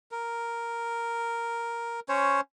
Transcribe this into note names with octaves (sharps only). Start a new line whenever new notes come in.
A#4
C#4 C5 C#5